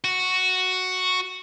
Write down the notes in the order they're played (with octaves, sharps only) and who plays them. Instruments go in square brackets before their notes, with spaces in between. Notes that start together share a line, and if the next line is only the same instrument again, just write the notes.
[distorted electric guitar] F#4